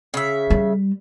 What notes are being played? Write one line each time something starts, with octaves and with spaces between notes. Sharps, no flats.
C#3 E5
G3